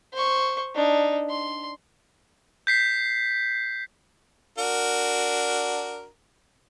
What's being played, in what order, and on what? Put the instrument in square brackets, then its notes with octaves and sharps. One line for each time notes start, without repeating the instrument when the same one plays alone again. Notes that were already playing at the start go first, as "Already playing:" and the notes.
[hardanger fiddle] C5 C#6
D4 D#4
C6
[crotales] G6 B6 C7
[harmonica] D4 F#4 A#4